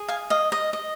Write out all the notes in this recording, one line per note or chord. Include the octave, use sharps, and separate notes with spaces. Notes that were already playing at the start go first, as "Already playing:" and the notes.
Already playing: G#4
F5 G#5
D#5 F5
D#5
D#5